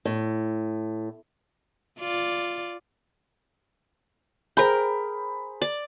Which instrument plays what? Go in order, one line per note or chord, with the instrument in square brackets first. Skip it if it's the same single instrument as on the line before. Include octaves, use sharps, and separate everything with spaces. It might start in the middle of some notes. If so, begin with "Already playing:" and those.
[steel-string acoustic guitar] A2
[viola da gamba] F4 D5
[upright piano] G#4 C5 B5 [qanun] A#4 G5
[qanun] D5